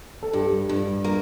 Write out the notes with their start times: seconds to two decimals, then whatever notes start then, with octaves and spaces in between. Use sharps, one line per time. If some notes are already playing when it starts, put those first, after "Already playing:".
0.23 A4
0.33 G2 G4
0.69 G2
1.04 A#3